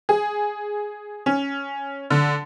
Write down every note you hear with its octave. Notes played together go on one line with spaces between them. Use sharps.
G#4
C#4
D3